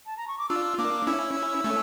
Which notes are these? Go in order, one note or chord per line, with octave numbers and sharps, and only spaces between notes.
A5
A#5
C#6
D6
D4 F4 E6
A#3 D4 D6
C#4 E4 E6
A3 C#4